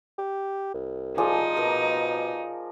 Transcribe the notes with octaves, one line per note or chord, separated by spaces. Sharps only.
G4
C2
F3 D#4 G#4 D5
B2 A#4